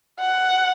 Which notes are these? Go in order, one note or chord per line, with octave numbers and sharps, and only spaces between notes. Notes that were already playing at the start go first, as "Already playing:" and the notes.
F#5